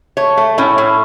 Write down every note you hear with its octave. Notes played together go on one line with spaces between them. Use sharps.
A3 C#5
A3
A2 C#4
A2